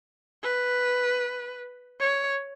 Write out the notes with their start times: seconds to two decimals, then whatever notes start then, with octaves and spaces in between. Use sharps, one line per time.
0.43 B4
2.00 C#5